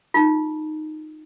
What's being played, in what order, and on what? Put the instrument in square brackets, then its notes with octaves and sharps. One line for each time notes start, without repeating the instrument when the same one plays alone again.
[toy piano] D#4 F4